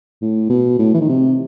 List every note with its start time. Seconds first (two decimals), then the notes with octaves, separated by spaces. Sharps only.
0.22 A2
0.50 B2
0.79 A2
0.94 E3
1.01 D#3
1.09 C3